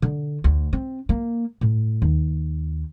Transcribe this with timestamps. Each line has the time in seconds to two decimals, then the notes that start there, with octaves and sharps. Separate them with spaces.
0.02 D3
0.44 D2
0.73 C4
1.09 A#3
1.61 A2
2.02 D#2